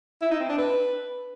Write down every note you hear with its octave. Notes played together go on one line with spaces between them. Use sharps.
E4
D#4
C4
D4
B4